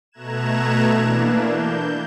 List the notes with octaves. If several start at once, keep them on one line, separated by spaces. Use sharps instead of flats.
B2 A3 A#5 F#6 G#6 E7
E3 A#3 D4
G6